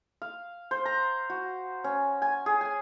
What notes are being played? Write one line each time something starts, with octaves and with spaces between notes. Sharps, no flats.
F5
C5
A#5
F#4
C#4
G#5
G#4
G#5